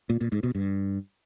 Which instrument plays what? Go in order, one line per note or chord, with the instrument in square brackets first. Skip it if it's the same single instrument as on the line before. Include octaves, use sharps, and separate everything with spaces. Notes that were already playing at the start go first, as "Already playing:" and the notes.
[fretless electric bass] A#2
A#2
G#2
B2
G2